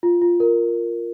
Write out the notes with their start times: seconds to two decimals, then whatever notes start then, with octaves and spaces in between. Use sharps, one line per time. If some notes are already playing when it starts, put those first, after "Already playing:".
0.03 F4
0.22 F4
0.40 A#4